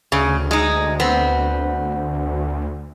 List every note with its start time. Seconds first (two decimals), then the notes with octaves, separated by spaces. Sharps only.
0.12 D2 C#3
0.51 G#3 D#4
1.00 B3 C4